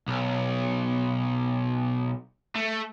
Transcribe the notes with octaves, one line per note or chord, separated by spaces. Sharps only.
B1
A3